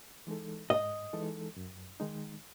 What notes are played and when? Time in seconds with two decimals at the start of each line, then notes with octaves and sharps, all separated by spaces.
0.27 E3 G#3 D#4 A4
0.70 G#2 D#5
1.13 E3 G#3 D#4 A4
1.56 F#2
2.00 D#3 G#3 D#4